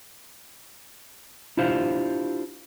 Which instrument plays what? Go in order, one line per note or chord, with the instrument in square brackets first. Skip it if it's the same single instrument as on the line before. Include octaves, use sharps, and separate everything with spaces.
[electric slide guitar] D4 E4 F4 G4 C5 F5